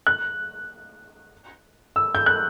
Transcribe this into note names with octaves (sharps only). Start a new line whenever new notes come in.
F#6
E6
G6
F#6